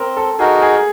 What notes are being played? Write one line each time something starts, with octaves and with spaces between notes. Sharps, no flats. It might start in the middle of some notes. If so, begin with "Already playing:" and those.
Already playing: C4 A#4
A4
D#4 F#4 G#4 A#4
G#4